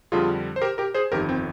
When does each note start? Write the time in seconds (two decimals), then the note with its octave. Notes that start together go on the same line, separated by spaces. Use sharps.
0.12 F2 D3 G3 F4 G#4
0.56 C5
0.61 G4 A#4
0.78 G4 A#4
0.94 G#4 C5
1.12 G1 F2 D#3 G4 A#4
1.29 C4